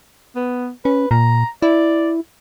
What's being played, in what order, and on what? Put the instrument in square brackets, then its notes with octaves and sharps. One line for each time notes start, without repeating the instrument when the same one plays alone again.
[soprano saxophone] B3
[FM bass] C#4 [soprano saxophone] B4
[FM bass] A#2 [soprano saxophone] A#5
[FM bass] E4 [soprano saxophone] D5